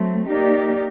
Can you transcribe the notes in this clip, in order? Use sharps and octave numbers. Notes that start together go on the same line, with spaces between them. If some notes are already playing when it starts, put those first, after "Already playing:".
Already playing: F#3 A3 C4
A#3 D#4 G4 A#4 D5